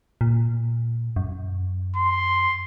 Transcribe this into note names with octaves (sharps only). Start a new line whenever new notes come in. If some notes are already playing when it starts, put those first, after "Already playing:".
A#2
F#2
C6